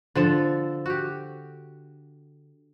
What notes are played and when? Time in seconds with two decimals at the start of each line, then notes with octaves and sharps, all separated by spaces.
0.15 D3 F3 A4
0.86 F#4 G4